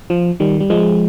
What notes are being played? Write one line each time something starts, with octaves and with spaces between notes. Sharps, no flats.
F3
D#3 G3
G3
F3 G#3